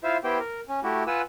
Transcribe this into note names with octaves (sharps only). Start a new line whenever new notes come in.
E4 F4 C5 E5 F5
B3 E4 G4 C5 G5
A#4
C#4
A3 E4 F#4 G4
F4 B4 F#5 G#5 E6